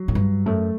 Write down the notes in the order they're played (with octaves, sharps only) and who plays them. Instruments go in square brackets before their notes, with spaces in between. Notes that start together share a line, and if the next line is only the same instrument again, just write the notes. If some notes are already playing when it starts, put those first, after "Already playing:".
Already playing: [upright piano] F#3
[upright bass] A2
G2
[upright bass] F#2 [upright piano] A3